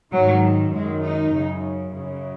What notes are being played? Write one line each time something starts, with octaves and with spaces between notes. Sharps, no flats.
G#2 D#3 F#3
F#2 D#3 G#3
D#4
F#2 C#3
F#2 C#3